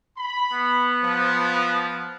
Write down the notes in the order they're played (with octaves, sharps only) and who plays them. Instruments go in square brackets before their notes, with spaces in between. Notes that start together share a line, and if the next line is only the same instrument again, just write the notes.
[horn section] B5
[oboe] B3
[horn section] F3